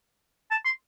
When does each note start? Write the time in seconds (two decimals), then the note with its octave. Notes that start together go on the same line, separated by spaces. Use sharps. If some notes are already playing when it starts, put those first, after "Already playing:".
0.51 A5
0.65 C6